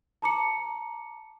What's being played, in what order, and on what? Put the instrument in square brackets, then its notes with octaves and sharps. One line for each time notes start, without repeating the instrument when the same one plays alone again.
[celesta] A5 A#5 D6 C#7